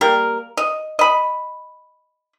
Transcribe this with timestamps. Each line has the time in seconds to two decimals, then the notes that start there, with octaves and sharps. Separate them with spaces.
0.01 G3 A#3 A#4
0.57 D#5
0.99 D#5 B5